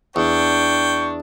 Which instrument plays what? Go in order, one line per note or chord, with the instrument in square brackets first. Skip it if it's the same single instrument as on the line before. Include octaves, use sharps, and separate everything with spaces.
[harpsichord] E2 [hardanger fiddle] D4 [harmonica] G5 [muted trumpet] C#6